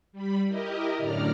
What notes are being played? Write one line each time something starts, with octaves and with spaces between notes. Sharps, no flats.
G3 B5
E4 G4 A#4 D#5
F#2 A2 D3 D5 A#5 F6